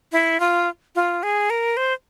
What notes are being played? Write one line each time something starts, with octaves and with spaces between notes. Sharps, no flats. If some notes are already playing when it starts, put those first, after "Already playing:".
E4
F4
F4
G#4
A#4
C5